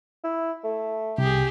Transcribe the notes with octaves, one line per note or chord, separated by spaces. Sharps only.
E4
A3
C2 G4 G#4